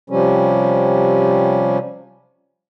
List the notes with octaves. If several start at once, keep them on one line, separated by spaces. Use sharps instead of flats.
C3 F3 G3 C#4